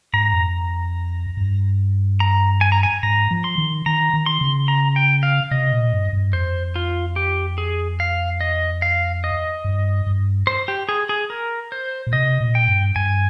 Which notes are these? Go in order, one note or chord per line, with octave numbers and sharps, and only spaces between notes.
G#2 A#5
F2
G2
A#5
G#5
A#5
G#5
G#2 A#5
F3
C6
D#3
D#3 A#5
D#3
C6
C#3
A#5
G5
F5
C3 D#5
A#2
G2
G2
F2 C5
F4
G4
G#4
F5
D#5
F5
D#5
G2
G2
C5
G4
G#4
G#4
A#4
C5
A#2
C3 D#5
A#2
G5
G2
G2 G#5